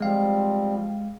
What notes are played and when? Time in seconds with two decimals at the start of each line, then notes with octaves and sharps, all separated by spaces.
0.01 F3 G3 G#3 C4 F5